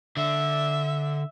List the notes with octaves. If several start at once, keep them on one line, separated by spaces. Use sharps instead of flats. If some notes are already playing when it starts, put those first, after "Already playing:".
D3 E5